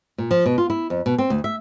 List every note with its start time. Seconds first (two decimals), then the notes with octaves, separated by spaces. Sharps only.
0.18 A#2
0.31 F3
0.46 B2
0.58 F4
0.70 E4
0.90 F2
1.06 B2
1.18 C4
1.30 D2
1.44 E5